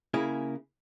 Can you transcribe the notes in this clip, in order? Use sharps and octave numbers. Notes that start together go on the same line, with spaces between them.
C#3 A#3 E4 G#4